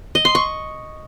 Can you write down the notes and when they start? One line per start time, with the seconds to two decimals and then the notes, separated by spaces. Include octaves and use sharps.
0.15 D#5
0.25 C6
0.35 C#6